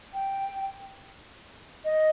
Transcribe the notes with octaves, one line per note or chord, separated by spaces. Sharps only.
G5
D#5